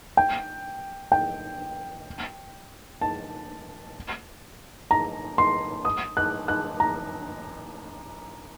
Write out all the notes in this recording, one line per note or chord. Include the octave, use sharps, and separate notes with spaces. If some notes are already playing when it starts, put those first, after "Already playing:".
G5
G5
A5
A#5
C6
D#6
F#6
F#6
A#5